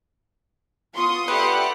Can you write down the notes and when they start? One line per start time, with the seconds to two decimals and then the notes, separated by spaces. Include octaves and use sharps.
0.94 B3 F4 C6 C#6 D#6
1.28 G4 A4 B4 D5 E5 F#5